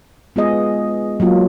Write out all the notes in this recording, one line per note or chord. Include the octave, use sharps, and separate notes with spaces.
G#3 B3 F4 G#4 D#5
F#3 A#3 F4